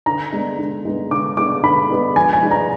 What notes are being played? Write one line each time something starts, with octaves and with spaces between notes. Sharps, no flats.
D3 A#5
G#3 B3 D4
D3
G#3 B3 D4
D3 D6
G#3 B3 D4 D6
D3 B5
G#3 B3 D4
F3 G#5
G#5
G#3 D4
A#5